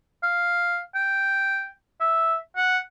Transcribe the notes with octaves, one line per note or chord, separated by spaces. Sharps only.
F5
G5
E5
F#5